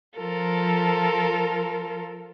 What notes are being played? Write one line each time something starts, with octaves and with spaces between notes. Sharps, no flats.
F3 F4 A4 A#4